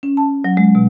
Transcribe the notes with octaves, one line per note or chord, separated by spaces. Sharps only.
C#4
A5
F#3
G#3
B2